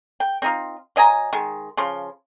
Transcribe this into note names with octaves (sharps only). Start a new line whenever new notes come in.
G5
C4 D#4 F4
F#3 D#5 G#5 A#5
D#3 G#3
C#3 F3 C6